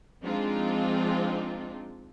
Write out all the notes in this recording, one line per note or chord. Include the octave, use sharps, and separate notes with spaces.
F3 G#3 C4 D4 D#4 F4